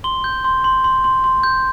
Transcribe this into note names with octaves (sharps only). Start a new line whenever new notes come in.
C6 G7
G6
C6
C6
C6
C6
C6
G6